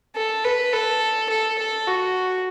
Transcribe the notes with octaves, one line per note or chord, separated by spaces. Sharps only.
A4
B4
A4
A4
A4
F#4